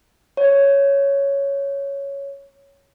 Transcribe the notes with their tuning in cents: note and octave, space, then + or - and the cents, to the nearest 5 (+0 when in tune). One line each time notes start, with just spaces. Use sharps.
C#5 +5